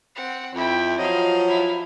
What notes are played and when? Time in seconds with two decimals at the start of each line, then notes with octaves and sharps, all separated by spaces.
0.16 C4 F#5
0.54 F2 E4 G5
0.98 F3 F#3 D#5 F5
1.49 E4 F5